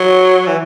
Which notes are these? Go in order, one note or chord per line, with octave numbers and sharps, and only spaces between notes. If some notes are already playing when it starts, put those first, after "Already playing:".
Already playing: F#3
E3